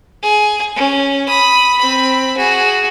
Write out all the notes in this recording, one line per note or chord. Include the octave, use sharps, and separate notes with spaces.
G#4
C#4
B5 D#6
C4 B5
F#4 G#4